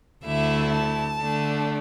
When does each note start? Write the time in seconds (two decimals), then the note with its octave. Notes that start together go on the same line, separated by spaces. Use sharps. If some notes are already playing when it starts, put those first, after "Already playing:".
0.23 D2 D3 A3 E4 E5
0.72 A5
1.21 D3 A3 D4